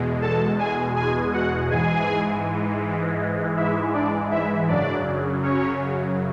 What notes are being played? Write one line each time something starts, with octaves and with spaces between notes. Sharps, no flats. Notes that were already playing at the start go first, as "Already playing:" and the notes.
Already playing: E2 B2 G#3
A4 A5
G#4 G#5
G#4 G#5
F#4 F#5
G#2 E3 G#3 G#4 G#5
E4 E5
D4 D5
E4 E5
F#2 C#3 F#3 D4 D5
C#4 C#5